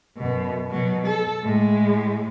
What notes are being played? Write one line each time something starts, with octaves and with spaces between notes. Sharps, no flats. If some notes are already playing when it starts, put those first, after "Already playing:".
F#2 B2
B2 F#3
A4
A2 G#3